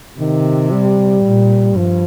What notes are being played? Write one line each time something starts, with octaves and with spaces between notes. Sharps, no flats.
C3 D#3
G3
A#2
G2 F3